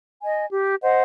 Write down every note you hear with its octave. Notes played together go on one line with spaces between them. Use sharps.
D#5 G#5
G4
C5 D#5 F#5